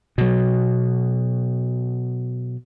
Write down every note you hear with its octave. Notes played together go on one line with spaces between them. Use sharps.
B2 F#3